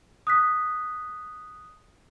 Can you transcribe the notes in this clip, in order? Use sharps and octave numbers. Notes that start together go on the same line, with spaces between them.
D#6 F#6 B6